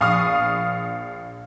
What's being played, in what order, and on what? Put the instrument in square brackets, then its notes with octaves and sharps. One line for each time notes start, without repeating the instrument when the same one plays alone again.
[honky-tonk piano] A#1 F5 C#6 D#6 F6